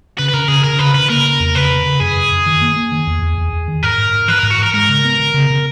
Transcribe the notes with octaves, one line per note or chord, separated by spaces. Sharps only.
C#3 B4
B4
C#3 A#4
C#3 G#4
C#3 A#4
C#3 B4
C#3 B4
A#3 A#4
C#3
E2
C#3 B4
C#3
C#3
F#2 G#4
F#2
F#2
D#3
A#3
A#3
D#3
E2
E2
E2
E2
D#3
G#2 A#4
G#2
G#2
E3 B4
G#2 A#4
F#4
G#2 A#4
G#3 A#4
C#3
B3
C#3
C#3
C#3